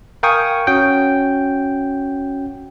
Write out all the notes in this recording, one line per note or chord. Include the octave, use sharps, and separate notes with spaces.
A#4 F5 G5 G#5 C#6 D#6
C#4 F#4 G5